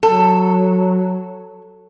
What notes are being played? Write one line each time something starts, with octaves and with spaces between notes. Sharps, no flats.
F#3 A4